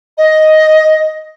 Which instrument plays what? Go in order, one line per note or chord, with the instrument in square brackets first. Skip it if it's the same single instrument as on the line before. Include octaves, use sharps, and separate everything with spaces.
[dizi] D#5